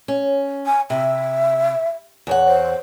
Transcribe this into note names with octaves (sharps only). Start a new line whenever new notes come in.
C#4
G#5
C3 E5
E2 C#5 F#5
C5